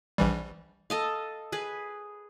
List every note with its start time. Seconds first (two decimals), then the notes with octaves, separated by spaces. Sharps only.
0.18 A#1 E3 G3
0.90 A4 D#5 F5
1.52 G#4 B4